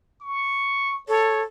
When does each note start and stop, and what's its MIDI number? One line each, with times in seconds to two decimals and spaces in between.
0.22 1.03 85
1.08 1.43 69
1.08 1.42 73